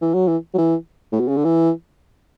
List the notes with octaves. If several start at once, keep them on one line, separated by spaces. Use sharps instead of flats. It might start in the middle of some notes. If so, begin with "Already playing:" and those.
E3
F#3
E3
F#3
E3
A2
B2
C#3
D3
E3